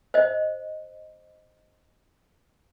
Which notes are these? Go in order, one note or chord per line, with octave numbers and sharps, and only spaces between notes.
C5 D#5